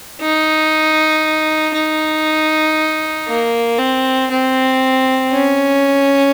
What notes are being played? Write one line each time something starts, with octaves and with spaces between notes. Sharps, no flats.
D#4
D#4
A#3
C4
C4
C#4